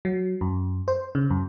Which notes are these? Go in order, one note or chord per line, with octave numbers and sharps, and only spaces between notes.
F#3
F#2
C5
C#3
F#2